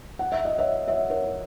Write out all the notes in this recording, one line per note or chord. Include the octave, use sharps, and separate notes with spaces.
F#5
E5
D#5
C#5 E5
C#5 E5
A#4 C#5